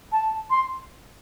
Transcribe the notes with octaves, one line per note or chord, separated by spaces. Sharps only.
A5
C6